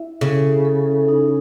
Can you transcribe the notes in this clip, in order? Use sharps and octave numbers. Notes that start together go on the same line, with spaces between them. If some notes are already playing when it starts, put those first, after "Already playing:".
Already playing: E4 E5
C#3 A4
A4
D#4